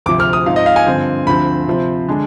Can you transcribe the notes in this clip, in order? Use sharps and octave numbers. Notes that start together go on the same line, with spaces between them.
D2 C3 F3 D6
F6
D#6
G#2 F3 C4 D#4 F5
D#5
F5
G#5
G2 D3 F3 C4
D2 D3 F3 C4 B5
C3 F3 C4
D3 G#3 D4